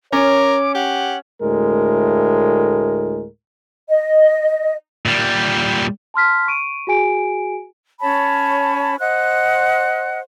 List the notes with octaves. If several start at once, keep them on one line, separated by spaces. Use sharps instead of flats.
C#4 A#4 C#5 D6
G4 F#5
D2 A2 G#3 A#4
D#5
A#2 G3
A5 C6 F6 B6
C#6 D7 D#7
F#4 G#4 G#5 D7
C#4 C#5 A5 B5
C5 D#5 F#5 F#6